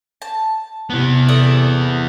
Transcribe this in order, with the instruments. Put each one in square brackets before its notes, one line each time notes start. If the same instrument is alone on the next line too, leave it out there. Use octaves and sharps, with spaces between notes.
[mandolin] A5
[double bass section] C3 [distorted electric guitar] E3 B3
[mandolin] A4 D5 D#6